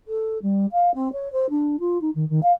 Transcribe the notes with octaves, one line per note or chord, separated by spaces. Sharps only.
A4
G3
F5
C4
C#5
C5
D4
F4
D#4
D#3
D#3
F5